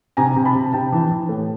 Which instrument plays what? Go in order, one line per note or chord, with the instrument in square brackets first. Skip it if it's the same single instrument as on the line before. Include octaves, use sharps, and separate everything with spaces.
[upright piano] C3 G#5 A#5
C3
A5 B5
C3
C3 G5 A5
E3
E3
A2